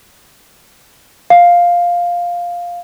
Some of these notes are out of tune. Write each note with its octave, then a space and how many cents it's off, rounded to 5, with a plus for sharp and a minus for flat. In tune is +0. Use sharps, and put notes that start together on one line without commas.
F5 +5